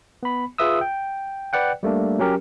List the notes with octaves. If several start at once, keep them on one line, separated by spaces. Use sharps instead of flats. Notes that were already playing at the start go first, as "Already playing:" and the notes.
B3 B5
F4 G#4 B4 E5 D#6 E6
G5
B4 D5 F#5 G5
G3 A3 A#3 D4
F#3 C#4 G4 A#4